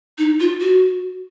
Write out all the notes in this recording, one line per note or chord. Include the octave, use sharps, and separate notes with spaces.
D#4
F4
F#4